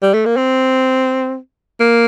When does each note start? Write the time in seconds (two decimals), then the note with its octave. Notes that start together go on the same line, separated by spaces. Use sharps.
0.03 G3
0.14 A3
0.26 A#3
0.37 C4
1.81 A#3